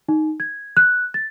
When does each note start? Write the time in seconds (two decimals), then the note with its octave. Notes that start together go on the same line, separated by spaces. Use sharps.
0.09 D#4
0.40 G#6
0.77 F#6
1.14 A6